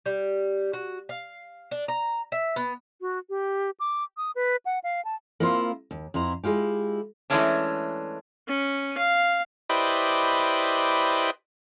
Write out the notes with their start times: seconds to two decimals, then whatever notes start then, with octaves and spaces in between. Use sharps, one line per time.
0.06 G3
0.73 F#4
1.09 F5
1.71 D4
1.88 A#5
2.32 E5
2.56 B3
3.01 F#4
3.30 G4
3.80 D6
4.17 D#6
4.35 B4
4.66 F#5
4.84 F5
5.05 A5
5.40 A#3 C4 E4 F4 G#4 C5
5.91 D#2
6.14 F2 E4 C5 A#5
6.44 G#3 E4 F4 G4
7.30 E3 G#3 A3 C#4 D4
8.48 C#4
8.98 F5
9.70 E4 G4 B4 C5 D5 D#5